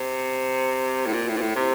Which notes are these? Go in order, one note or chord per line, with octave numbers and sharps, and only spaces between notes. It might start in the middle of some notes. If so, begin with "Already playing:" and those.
Already playing: C3
A2
A#2
A2
A#2
A2
C3